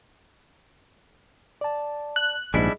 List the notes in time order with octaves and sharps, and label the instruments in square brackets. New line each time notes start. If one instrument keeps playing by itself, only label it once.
[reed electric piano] D5 A5
[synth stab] F#6
[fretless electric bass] A#1 G#2 [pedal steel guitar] G3 D4 E4 [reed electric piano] G#4 D#5